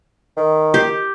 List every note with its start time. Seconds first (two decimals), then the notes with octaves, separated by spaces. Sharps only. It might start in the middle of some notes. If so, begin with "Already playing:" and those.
0.37 D#3
0.74 G4